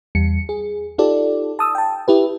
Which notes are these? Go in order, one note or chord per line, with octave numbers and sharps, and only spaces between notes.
E2 G3 C#7
G#4
D#4 F4 G4 A4 D5
A5 D#6 E6
G5 A5
E4 G4 B4